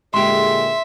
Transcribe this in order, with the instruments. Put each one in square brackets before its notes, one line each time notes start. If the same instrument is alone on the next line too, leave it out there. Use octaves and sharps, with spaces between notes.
[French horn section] A#2 D3 G#4 [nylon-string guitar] G#3 G4 [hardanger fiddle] E5 [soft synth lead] C6